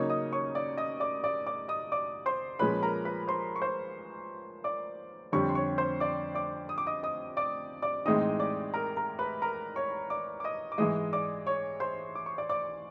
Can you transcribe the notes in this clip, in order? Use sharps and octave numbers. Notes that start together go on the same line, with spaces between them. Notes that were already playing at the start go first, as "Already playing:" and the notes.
Already playing: C#3 F#3 A#3 D#4 C#5 C#6
D#5 D#6
C#5 C#6
D5 D6
D#5 D#6
D5 D6
D5 D6
D5 D6
D#5 D#6
D5 D6
C5 C6
A#2 F3 G#3 C#4 B4 B5
A#4 A#5
B4 B5
C5 C6
C#6
C5 C6
D5 D6
F2 D3 G3 C4 C#5 C#6
C6
C#5 C#6
C5 C6
D5 D6
D5 D6
D#6
D6
D#5 D#6
D#5 D#6
D5 D6
D5 D6
A2 E3 G#3 C4 D#4 D#5 D#6
D5 D6
A#4 A#5
A#4 A#5
B4 B5
A#4 A#5
C#5 C#6
D5 D6
D6
D#5 D#6
D6
G#2 E3 G#3 D#5 D#6
D5 D6
C#5 C#6
C5 C6
D6
C#6
D5 D6
D5 D6